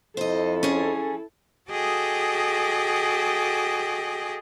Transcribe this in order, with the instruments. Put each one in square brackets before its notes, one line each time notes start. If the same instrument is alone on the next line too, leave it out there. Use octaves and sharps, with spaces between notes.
[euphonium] F2 [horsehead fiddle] E4 A4 [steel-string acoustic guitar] C5 D#5
[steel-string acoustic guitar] C#4 G#4
[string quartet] F#4 G#4 A4 D#5 G5 D6